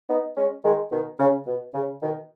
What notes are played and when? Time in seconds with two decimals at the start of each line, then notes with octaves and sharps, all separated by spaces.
0.09 B3 D#4
0.37 G#3 C#4
0.64 D#3 G#3
0.92 B2 D#3
1.19 C#3
1.47 B2
1.74 C#3
2.02 B2 D#3